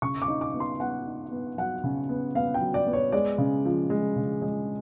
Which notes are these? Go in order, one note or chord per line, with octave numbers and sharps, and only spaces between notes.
C#3 C#6
D6
D#4
D6
B3
C6
B3 F#5
D#4
B3
F#3 F#5
C#3
B3
B3 F5
G5
F#3
D5
B3
C#5
G#3 D5
C#3
F3
G#3
C#3
G#3